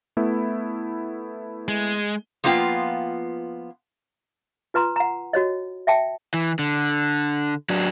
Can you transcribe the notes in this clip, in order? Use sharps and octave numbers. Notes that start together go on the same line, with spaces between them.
A3 B3 E4
G#3
F3 A#3 B3 F4 F5 G5
F4 B4 A#5 C6
F#5 A#5
F#4 C#5 D#5
E5 G5 A5
E3
D3
F#3 D4